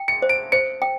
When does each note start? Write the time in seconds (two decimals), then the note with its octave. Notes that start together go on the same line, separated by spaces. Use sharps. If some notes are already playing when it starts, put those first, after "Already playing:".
Already playing: G5
0.08 C#7
0.22 C5
0.29 D7
0.52 C5 C#7
0.82 G5